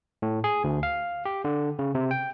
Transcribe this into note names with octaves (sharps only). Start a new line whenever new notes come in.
A2
G#4
D2
F5
G4
D3
C#3
C3
G5